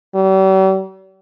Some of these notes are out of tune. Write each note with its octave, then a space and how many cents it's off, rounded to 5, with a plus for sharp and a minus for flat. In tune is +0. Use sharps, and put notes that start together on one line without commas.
G3 -45